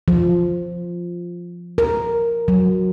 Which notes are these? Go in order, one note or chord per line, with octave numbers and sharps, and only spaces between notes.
F3
A#4
F#3